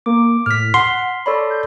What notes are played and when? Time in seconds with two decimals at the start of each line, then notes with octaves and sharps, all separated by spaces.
0.06 A#3 D6
0.46 A2 F6 B6
0.74 F#5 C6
1.26 A4 C#5 D5 B5
1.50 G6